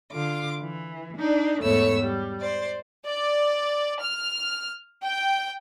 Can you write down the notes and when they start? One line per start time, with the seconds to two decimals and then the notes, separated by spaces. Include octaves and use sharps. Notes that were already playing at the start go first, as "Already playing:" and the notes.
0.12 D3 F4 D6
0.60 E3
1.17 D4 D#4 D5
1.60 E2 G#2 A3 B3 C#5 E6
2.02 G3
2.40 C5 D5
3.06 D5
4.01 F6
5.04 G5